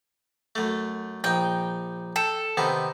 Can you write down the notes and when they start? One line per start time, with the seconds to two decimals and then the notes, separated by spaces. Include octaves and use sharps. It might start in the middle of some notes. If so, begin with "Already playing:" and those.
0.55 F#2 A3
1.24 A#1 D#4 G5
2.16 A4 G5
2.57 C3 D#3 B3